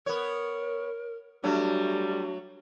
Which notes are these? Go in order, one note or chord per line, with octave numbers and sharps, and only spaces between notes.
B3 A#4 C#5
F#3 G3 A3 D4 F#4